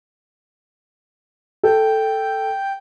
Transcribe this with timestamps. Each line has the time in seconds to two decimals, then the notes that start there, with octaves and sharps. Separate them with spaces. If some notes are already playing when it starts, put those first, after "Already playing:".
1.63 A4 G5